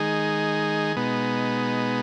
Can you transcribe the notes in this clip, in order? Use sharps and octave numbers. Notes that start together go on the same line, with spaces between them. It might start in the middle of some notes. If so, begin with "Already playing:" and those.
Already playing: D#3 G#3 D#4 G#4
B2 G#3 B3 D#4